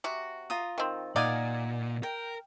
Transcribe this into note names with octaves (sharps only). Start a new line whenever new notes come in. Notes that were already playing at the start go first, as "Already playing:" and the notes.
C3 F#4
F4 A#5 D#6
D#3 C4
A#2 D#4 D5 F5 F#5 G#5
A#4 G5